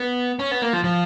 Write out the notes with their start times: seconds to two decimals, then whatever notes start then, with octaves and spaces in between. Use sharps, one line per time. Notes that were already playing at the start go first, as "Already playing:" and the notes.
Already playing: B3
0.39 C#4
0.51 B3
0.62 A#3
0.73 F3
0.84 F3